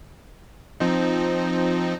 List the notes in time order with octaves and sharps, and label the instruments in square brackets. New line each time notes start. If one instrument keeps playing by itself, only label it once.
[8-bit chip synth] F3 C4 D#4